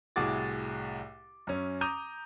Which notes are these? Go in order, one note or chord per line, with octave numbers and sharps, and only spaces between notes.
C2 A2 F#4 G#4 D6 A6
F#2 C#4
A#5 D6 D#6 G6 D#7 F7